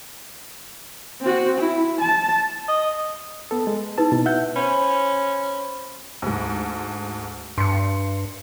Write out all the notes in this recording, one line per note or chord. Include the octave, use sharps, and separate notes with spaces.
C4 F#4
E4
A5
D#5
B3 A4
G#3
D#4 E4 B4 A5
B2
E5 F#5 G6
C#4 C5 B5
D2 G#2
G2 C6 C#7